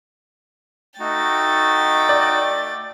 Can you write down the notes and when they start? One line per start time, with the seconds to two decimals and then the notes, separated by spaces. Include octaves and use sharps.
1.00 A3 D#4 F#4 G5 A6
2.09 D5